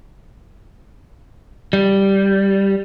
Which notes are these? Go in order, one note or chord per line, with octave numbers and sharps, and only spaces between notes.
G3